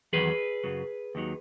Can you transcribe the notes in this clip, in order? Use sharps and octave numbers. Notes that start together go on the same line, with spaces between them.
E2 D#3 F#3 G#4 B4
F#2 C#3 F#3
D#2 D#3 F#3